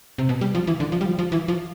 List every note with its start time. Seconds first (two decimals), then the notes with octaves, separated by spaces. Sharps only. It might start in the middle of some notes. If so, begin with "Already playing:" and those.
0.18 C3
0.29 B2
0.41 G3
0.55 F3
0.67 E3
0.80 D3
0.92 F3
1.01 G3
1.06 F3
1.19 F3
1.32 E3
1.48 F3